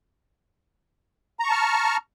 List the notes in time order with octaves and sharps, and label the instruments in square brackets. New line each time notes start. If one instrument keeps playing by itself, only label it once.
[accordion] A#5
C#6
A5
F6